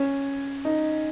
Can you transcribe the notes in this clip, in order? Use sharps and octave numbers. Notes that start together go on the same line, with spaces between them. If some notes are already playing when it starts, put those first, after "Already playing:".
Already playing: C#4
D#4